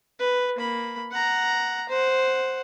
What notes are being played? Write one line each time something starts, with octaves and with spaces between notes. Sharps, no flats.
B4
A#3 B5
F#5 A#5
C5 F#5